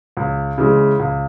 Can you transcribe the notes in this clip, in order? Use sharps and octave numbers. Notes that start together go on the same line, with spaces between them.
C#2
C#3 E3 G#3
C#2